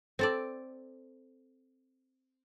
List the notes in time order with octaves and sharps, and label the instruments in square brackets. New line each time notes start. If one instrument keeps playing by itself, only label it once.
[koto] C4 A4 D5